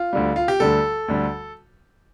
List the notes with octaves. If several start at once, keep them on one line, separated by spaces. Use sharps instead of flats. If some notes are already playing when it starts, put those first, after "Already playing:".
Already playing: F4
D2 D3 G3
F4
G4
D2 D3 G3 A4
D2 D3 G3